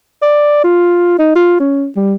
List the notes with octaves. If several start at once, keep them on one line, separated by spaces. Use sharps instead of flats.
D5
F4
D#4
F4
C#4
G3